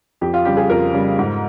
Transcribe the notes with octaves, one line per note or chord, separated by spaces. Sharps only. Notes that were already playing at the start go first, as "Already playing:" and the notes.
F2 G4
F4
C#3 G3 G4
G#4
F2 A#4
C#3 G3
G#2